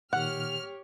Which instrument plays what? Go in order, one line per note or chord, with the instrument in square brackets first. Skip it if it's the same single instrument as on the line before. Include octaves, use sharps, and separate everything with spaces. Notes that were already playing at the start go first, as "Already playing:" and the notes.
[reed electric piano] A#2 D#3 [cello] G4 C#5 [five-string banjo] F#5 [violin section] F6